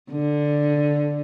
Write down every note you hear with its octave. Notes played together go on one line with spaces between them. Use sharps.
D3